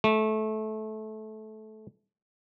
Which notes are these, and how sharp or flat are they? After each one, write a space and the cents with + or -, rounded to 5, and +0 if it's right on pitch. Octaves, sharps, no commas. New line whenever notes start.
A3 -20